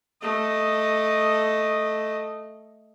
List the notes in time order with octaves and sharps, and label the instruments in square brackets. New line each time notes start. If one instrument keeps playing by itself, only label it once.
[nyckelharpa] A3 D#5